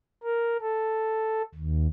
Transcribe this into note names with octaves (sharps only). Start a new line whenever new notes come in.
A#4
A4
D#2